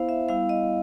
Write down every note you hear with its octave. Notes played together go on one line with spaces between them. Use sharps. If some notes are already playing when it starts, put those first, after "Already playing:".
Already playing: B3 E4 C5 F5
E5
G3 B3 E4 F5
D#5